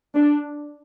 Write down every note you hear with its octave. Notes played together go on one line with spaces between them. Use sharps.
D4